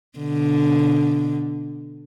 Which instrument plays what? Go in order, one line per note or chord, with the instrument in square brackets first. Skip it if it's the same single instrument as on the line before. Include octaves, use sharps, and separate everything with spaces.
[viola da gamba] B2 D3